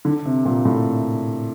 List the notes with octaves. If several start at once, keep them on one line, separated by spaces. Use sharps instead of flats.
D3
C3
A#2
A2